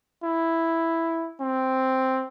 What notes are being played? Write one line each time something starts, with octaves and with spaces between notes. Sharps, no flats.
E4
C4